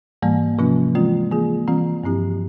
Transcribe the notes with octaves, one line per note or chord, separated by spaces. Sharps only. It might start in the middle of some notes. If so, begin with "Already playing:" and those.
G#2 E3 G3 A#3
C3 F3 A#3 C#4 F4
E3 G#3 C4 F4
E3 A#3 F4 G#4
E3 G3 C4 F4
G2 F3 C4 E4 G4